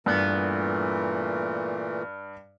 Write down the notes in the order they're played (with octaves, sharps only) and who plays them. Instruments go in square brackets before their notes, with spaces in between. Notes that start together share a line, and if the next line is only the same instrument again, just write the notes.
[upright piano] G2 [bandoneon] A#2 E3 A3 [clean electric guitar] B3